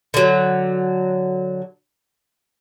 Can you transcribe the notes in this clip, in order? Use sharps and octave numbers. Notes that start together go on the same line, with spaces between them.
D3 F#3